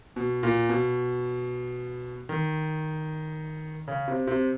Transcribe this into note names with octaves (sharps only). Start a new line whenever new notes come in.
B2
A#2
B2
D#3
C#3
C3
C3